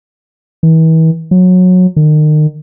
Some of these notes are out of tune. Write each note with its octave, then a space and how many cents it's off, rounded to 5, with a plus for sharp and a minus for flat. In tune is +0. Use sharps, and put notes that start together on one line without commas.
E3 -40
F#3 -20
D#3 -35